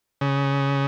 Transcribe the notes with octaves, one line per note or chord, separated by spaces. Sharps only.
C#3